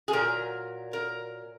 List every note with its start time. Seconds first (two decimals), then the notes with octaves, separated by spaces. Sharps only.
0.08 G#4
0.13 A#2 F#3 A#4
0.93 A#4